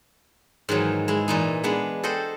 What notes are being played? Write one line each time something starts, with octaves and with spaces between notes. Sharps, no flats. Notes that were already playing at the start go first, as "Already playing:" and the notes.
G#2 D#3 E3 F#3
G#3 E4
A#2 E3 D#4
G#3 B3 D4
A4 C5 D#5 F#5 G5